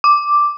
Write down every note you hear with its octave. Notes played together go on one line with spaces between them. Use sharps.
D6